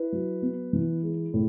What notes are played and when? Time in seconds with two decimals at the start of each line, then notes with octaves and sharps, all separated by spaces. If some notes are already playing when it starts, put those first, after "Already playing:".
Already playing: E4 B4
0.12 F#3
0.42 B3
0.73 E3
1.03 G#3
1.34 A2